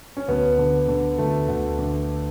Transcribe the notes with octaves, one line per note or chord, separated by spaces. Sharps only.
C#4
D2 B3
D3
D3
D2 A3
D2
D3